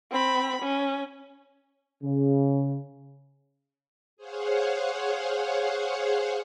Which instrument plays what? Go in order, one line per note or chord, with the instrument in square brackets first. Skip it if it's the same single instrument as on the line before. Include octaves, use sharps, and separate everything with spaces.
[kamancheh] C4 B5
C#4
[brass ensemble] C#3
[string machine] G#4 C5 C#5 F5 F#5